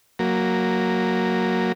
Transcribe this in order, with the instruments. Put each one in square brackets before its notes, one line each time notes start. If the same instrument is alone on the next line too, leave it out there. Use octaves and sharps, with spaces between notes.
[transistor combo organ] F#3 A#3